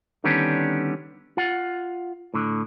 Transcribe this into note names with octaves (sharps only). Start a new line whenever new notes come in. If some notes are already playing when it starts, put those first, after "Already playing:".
D3 D#3 G3 B3 C#4 D4
F4 F#5
A2 D3